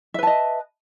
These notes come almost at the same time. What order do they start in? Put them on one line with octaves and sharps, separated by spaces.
E5 B4 A5 D#5